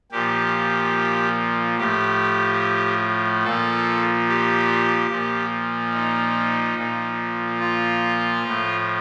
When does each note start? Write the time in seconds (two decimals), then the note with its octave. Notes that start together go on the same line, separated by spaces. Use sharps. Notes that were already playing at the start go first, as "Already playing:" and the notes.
0.11 A#2 F3 G4
1.77 A2 F3 G4
3.44 A#2 F3 A4
4.28 G4
5.10 A#2 F3
5.94 D#4
6.78 A#2 F3
7.60 F4
8.43 A2 F3